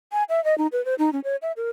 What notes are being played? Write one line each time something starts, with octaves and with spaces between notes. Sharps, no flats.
G#5
E5
D#5
D#4
B4
C5
D#4
C#4
C#5
E5
A#4